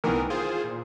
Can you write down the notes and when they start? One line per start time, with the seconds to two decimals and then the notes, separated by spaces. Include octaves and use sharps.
0.04 C2 D#3 E3 B3 A#4
0.30 F4 G#4 C5
0.64 A#2